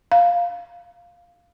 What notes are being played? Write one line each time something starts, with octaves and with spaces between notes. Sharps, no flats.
F5